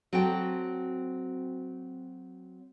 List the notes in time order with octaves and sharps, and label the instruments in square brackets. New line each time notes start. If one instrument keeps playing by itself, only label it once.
[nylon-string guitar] F#3 C4 F#4 A4 G5